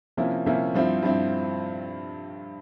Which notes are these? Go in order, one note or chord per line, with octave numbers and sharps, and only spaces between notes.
C3 F3 A#3 C#4 E4
C3 F3 A#3 C#4 E4
G2 F3 C4 E4
G2 F3 C4 E4